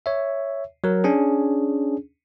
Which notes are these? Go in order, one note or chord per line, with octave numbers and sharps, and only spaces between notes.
C#5 E5
F#3 A#4
C#4 D4 G#4